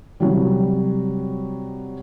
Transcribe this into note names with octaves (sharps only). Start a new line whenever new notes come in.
C3 F#3 G3